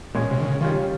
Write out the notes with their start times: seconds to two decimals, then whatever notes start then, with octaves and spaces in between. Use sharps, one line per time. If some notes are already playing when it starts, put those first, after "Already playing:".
0.15 A#2 G#3 C#4 G#4
0.31 C3
0.40 D#3
0.45 C#3
0.60 D#3 G3 C#4 F4